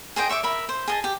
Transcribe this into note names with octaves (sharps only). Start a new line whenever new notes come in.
G#4 C5 D#5 G5
C#5 E5 C#6 D6
A#4 E5 B5
C5
G#4 D#5 A5
G4